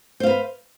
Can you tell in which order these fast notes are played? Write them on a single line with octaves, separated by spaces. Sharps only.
C5 F5 B4